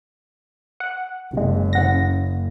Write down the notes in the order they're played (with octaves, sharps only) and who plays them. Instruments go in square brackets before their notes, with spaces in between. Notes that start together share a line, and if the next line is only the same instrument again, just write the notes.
[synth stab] F#5
[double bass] F#1 [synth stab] C3 G#3
[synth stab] C#3 F#5 A#6